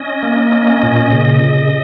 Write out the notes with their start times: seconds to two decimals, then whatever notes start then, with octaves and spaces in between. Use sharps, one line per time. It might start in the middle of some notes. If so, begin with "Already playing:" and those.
Already playing: C#4 D#5
0.23 A#3
0.52 C#4
0.83 A#2
1.13 C#3
1.42 C#3